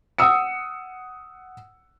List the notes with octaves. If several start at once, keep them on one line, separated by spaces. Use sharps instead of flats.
F#5 D#6 E6 C#7